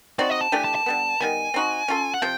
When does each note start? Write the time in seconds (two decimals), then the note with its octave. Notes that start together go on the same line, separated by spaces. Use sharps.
0.19 C4 D#4 F#4 D5
0.30 D#5
0.41 A5
0.52 E3 A3 D4 G4 G#5
0.65 A5
0.75 A5
0.86 D3 G3 B3
1.20 D#3 G3 B3 G#5
1.54 C4 D#4 F#4
1.88 C#4 F4 A4
2.14 F#5
2.22 C3 F3 G5